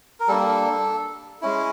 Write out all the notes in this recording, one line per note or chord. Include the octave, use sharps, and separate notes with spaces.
A#4
G3 A#3 D4 A4
G#3 C#4 E4